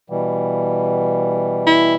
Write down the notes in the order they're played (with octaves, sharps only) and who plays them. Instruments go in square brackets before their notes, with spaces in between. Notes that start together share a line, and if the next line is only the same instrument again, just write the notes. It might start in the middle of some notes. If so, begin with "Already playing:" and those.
[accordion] B2 E3 G3
[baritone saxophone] E4